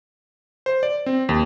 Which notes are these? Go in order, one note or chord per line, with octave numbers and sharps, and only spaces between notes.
C5
D5
C4
D#2